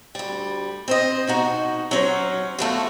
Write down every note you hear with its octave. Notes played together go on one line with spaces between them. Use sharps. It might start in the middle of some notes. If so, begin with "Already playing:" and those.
D2 G3
C4 C5 D#5
B2 D#4 F#4
F#3 C#4 C5
B2 F3 A3 F#4